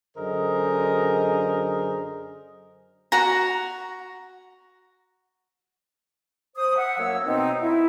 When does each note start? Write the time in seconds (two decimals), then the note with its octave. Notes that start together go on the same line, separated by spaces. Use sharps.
0.17 F#2 D3 G#4 A#4 C5 D#5
3.12 F#4 A#5
6.56 C5 D#6
6.77 E5 F#5
6.98 F#2 F#3 A#3 C#5 E6
7.25 B2 B3 C4 D#4
7.62 E4